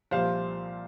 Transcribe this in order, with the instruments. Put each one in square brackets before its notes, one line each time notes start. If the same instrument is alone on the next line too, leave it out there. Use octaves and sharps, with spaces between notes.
[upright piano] C2 A#2 F3 C5 F5